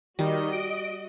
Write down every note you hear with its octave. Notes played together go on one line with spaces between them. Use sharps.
D#3 G3 F#4 D#5
D7